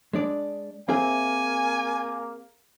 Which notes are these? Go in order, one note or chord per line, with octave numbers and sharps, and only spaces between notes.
G#3 D4 D5
A#3 C4 G#4 E5 G#5